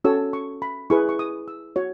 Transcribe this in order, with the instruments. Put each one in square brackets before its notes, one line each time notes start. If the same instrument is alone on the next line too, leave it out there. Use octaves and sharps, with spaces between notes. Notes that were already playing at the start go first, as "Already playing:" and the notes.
[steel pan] C#4 F#4 A4 C#5 E6
C#6
B5
E4 G#4 B4 C#6
C#6
D#6
E6
F#4 C#5